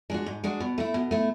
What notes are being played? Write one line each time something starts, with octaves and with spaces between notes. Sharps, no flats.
G#3 D4 F#4
G#2
G#3 D4 F#4
B2
A3 E4
B2
A3 E4